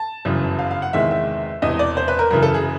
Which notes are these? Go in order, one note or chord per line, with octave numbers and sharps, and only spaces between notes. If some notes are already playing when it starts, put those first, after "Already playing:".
Already playing: A5
G1 F#2 C#3 E3
F5
F5
F#5
E2 C3 D#3 G#3 E5
E5
E1 E2 C3 D#5
D5
C5
B4
A#4
F#2 C#3 E3 A#4
A4
G#4